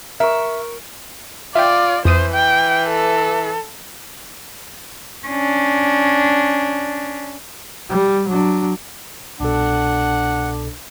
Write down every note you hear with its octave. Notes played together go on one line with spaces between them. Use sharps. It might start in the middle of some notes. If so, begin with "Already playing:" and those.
A#4 E5 C#6
F4 D5 E5 G5
F2 E3 C5 D#6 D#7
G5
A4
C#4 D4
G3
F#3 D4
C2 B2 D4 A4 F#5